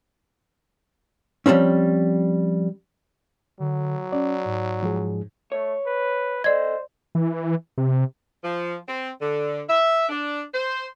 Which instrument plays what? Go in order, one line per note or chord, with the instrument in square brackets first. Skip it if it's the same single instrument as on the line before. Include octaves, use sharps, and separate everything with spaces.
[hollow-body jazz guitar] F3 G3 G#3 C4 C#4
[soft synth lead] D3 [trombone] F#3
[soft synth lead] C#4 [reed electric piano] D5
[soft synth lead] G#2
[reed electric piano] F3 G#3 G#4
[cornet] A3 [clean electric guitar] C#5
[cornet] B4
[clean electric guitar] A4 D#5 [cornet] C5 [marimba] D5 G#6
[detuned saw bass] E3
C3
[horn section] F3
C4
D3
E5
D4
C5